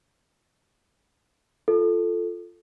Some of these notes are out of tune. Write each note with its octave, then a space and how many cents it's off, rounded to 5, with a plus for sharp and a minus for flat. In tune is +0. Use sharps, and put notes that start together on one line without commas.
F4 +0 A4 +0